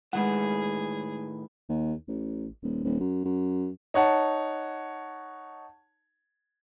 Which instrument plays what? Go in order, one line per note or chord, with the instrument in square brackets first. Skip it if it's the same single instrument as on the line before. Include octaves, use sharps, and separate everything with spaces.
[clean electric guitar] A2 D#3 B4 [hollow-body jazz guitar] G#3 F#5 [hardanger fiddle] G#4
[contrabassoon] D#2
A1
D#1
D#1
F#2
F#2
[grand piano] D#4 C#5 F#5 A5